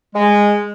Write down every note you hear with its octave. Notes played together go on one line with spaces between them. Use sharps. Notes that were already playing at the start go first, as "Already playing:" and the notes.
G#3